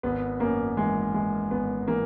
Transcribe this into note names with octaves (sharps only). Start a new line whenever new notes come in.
G#1 B3
F#2 A#3
E3 G#3
E3 G#3
G#1 B3
E3 A#3